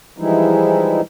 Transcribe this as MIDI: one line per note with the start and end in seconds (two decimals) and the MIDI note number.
0.18 1.01 52
0.18 1.01 53
0.18 1.01 55
0.18 1.01 56
0.18 1.01 63
0.18 1.01 64